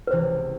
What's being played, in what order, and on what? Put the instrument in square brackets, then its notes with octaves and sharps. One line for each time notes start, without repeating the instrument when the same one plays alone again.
[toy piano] B4
[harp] C#2 C3 E3 [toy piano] C5